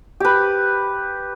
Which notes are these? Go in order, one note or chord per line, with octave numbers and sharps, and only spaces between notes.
G4 B4